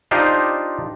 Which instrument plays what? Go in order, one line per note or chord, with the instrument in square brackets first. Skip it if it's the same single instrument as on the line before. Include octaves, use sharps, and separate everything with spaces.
[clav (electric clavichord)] D4 D#4 F4 G4 C5 D#5